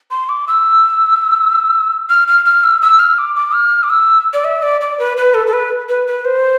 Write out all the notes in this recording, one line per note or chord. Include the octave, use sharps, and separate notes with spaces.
C6
D6
E6
F6
F6
F6
E6
E6
F6
D6
D6
F6
D6
E6
D5
E5
D5
D5
B4
B4
A4
A4
B4
B4
B4
C5